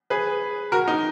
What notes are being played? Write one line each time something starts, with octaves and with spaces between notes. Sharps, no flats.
G#4 B4
F#4 A#4
D#4